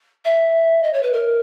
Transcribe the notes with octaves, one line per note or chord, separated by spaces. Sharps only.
E5
D#5
C#5
B4
A#4